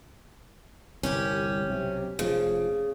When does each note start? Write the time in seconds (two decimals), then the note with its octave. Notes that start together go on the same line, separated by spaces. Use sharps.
1.03 G1 C2 C#4 G4
1.67 B1 C3
2.19 F1 C#3 F3